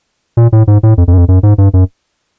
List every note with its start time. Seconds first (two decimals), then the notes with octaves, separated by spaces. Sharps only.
0.37 A#2
0.52 A2
0.67 G#2
0.83 A2
0.98 F2
1.08 F2
1.13 F#2
1.18 F2
1.28 F#2
1.43 G#2
1.58 G2
1.74 F#2